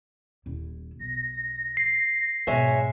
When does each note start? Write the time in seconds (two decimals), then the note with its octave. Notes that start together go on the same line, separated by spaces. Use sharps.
0.46 D#1 E4
1.00 B1 A#6
1.77 C7
2.47 G#2 B2 G#3 C#5 E5